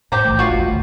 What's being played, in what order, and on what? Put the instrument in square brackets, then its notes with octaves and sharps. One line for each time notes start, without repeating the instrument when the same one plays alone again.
[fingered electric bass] A2 [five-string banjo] G4 C5 A#5
[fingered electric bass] B1 E3 A3
[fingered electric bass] A1 [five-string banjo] F4 F#4
[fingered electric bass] A1 D#2
D2 A3